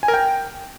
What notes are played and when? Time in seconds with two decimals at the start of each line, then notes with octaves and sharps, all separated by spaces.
0.03 G#5
0.08 A#4
0.14 G5